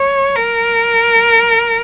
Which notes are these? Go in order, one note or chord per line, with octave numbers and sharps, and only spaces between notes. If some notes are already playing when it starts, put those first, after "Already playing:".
Already playing: C#5
A#4